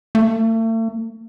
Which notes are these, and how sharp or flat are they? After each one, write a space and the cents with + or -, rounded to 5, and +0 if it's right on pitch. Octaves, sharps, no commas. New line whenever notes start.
A3 +40